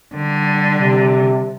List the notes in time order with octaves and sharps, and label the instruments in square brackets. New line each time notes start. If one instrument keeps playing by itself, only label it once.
[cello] D3 G3
[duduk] C3